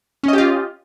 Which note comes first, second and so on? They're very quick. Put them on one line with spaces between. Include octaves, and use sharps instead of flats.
C#4 D#5 G4 F4